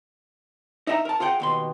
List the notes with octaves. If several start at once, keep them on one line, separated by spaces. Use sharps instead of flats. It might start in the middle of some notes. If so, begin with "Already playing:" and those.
D#4 D#5 E5 G5 A#5
A#4 A5
F4 G#4 F#5 G5
D#2 B2 C6